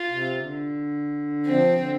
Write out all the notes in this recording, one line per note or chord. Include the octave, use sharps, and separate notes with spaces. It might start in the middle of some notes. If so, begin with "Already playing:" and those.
Already playing: F4
C3
D3
F3 C4
C3
D3